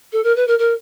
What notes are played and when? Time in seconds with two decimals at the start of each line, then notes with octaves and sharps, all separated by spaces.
0.12 A4
0.23 A#4
0.35 B4
0.47 A#4
0.58 A#4